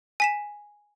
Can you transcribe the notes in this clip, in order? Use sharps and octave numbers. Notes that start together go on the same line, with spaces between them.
G#5 B6 E7